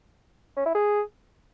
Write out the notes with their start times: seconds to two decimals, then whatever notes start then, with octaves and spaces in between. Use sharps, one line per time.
0.56 C#4
0.66 E4
0.75 G#4